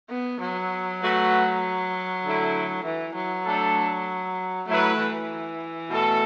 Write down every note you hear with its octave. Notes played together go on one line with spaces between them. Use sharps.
B3
F#3
A3 F#4 B4
D3 A3 E4
E3
F#3
A3 D4 A4
F#3 A3 E4 B4
E3
B2 A3 E4 A4